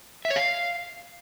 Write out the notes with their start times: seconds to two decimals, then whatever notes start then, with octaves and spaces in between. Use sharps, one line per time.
0.25 E5
0.30 C#5
0.36 F5